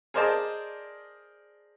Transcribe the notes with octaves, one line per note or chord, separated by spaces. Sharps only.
G#4 A#4 C5 D5 D#5 A5